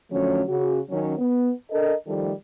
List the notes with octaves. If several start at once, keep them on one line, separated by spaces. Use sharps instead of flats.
D3 F3 F#3 A3 C#4
C#3 F#4
D#3 F#3 C#4
B3
D4 A4 A#4 D#5
D#3 F3 G3 A3